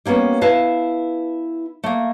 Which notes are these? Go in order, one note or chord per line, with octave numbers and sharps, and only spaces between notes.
G3 A#3 B3 C#4
E4 B4 F5 A5
A3 A#3